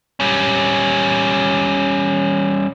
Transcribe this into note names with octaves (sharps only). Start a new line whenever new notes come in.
G3 C#4